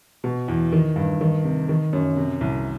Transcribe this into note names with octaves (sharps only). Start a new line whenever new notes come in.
B2
E2
D#3
G2
D#3
C3
D#3
F#2
C3
C2